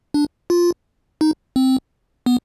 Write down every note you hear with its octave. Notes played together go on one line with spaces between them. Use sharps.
D4
F4
D#4
C4
B3